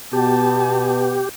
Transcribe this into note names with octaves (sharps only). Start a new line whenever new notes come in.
B2 B3 G4 A5